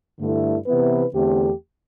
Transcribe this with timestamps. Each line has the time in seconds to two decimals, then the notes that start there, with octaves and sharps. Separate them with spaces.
0.18 G2 D3 A3 E4
0.65 C3 E3 B3 E4 B4
1.13 E2 D3 A3 C4 G4